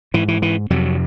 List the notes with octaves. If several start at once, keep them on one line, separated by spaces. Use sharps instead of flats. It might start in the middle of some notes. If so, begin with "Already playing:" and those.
G#2 E3
E3
E3
F2 C3 F#3